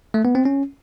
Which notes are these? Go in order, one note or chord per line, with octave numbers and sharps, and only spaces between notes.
A3
B3
C4
C#4